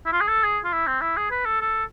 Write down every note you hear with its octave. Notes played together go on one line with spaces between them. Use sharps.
E4
F4
G#4
A4
G#4
F4
E4
C4
E4
G#4
B4
A4
A4